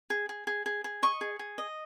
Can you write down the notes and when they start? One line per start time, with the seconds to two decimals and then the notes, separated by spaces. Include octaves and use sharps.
0.10 G#4
0.29 G#4
0.47 G#4
0.66 G#4
0.84 G#4
1.03 D#5 C#6
1.21 G#4
1.39 G#4
1.58 D#5